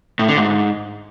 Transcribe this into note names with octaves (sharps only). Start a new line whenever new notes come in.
A2
D3
G#2